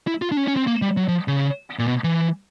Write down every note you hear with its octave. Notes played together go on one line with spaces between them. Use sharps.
E4
F4
D4
C#4
C#4
C4
A#3
G3
F#3
F3
C#3
A#2
B2
E3